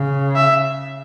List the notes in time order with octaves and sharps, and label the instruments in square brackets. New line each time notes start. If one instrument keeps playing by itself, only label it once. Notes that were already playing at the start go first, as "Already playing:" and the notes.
Already playing: [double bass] C#3
[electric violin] E5